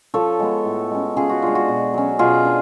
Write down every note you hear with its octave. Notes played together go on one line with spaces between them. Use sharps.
F3 A4 C#5
G#3 B3
A2
G#3 C#4
C#3 F4 G#4
F#4
G#3 D4 F4
F#4
B2
F#3 C#4
B2 F4 G#4
D4